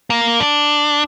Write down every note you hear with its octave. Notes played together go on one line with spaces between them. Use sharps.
A#3
D4